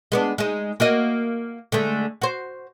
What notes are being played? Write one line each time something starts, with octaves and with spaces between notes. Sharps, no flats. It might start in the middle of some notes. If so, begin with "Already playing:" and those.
G#3 B3 D4
G#3 D#4
A#3 F#4 D#5
D3 G#3 A3
F#4 C5